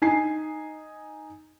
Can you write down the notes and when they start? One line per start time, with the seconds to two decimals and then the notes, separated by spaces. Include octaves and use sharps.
0.02 D#4 G#5 C7